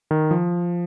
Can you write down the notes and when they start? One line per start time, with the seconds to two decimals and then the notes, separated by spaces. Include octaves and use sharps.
0.11 D#3
0.31 F3